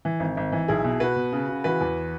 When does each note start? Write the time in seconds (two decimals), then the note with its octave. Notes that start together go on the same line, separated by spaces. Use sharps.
0.05 E3
0.20 G#1
0.37 G#1
0.52 E3
0.68 B1 E4 G#4
0.84 B2
1.00 B2 F#4 B4
1.16 B2
1.32 C#3
1.49 C#3
1.64 E3 F#4 B4
1.81 E2